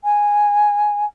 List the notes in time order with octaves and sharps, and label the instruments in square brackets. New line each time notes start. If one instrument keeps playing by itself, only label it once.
[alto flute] G#5